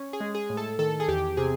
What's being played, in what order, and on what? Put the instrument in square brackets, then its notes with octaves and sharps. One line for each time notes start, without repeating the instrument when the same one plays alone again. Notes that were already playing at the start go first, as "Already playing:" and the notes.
Already playing: [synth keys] C#4
G#4
G#3
G#4
A2
A4
D#3 A4
G#4
E2 G4
C3 G#4